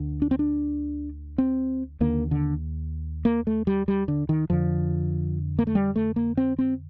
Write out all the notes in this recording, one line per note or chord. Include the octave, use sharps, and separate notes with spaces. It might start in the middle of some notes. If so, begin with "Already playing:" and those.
Already playing: D2 D3
D4
C4
D4
C4
D#2 D3 A#3
D3
A#3
A3
G3
G3
D3
D#3
F2 D3 F3
A#3
A3
G3
A3
A#3
C4
C4